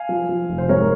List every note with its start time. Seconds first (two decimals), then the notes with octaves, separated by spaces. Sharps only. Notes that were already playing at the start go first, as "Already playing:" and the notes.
Already playing: F5 G#5
0.09 F3
0.29 F3
0.49 F1
0.58 C5
0.69 G#2 A#4 C#5